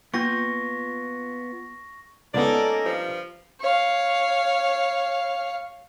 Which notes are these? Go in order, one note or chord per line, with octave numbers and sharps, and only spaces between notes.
A#3 B3 F4 C#6 G6 A#6
C#2 A#3 B3 C#4 D#4 A4 D5
G2 F3
C#5 F5